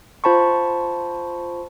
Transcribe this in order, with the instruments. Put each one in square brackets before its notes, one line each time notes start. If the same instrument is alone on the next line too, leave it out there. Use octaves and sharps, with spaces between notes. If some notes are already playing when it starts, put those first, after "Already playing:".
[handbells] F4 C5 A5 B5 C#6